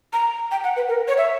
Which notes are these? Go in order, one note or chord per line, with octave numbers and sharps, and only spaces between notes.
A#5
G5
F#5
B4
A#4
C#5
E5